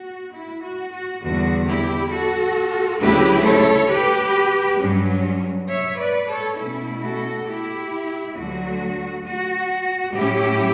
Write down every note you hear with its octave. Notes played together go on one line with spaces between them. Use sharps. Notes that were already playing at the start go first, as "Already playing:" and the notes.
Already playing: F#4
E4
F#4
F#4
E2 D3 G3 F#4
E4 G4
F#4 A4
D2 C#3 F#3 A3 E4 G4 B4
A4 C#5
G4 B4
G2 F#3 C#4
C#5 E5
B4 D5
A4 C#5
B2 A3 C#4 E4
F#4 A4
E4 G4
D2 D3 F#3 A3 F#4
F#4
A2 F#3 C#4 E4 G4